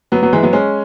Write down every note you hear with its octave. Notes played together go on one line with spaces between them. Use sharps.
F#3 B3
F#3 B3
E3 G#3
F#3 B3
G#3 C#4